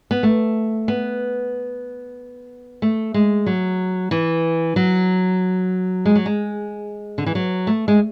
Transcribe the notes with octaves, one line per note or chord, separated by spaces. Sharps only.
B3
A3
B3
A3
G#3
F#3
E3
F#3
G#3
F#3
G#3
D3
E3
F#3
A3
G#3